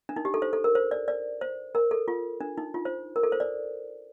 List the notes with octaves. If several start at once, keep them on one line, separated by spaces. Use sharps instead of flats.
D4
D#4
G4
A4
C5
A4
A#4
C5
D5
D5
C5
A#4
A4
F4
D4
D#4
F4
C5
A#4
A4
C5
D5